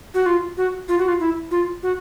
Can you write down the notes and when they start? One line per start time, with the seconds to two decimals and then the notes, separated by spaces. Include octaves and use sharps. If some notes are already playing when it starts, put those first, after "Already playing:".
0.14 F#4
0.26 F4
0.57 F#4
0.89 F4
0.98 F#4
1.08 F4
1.20 E4
1.51 F4
1.83 F#4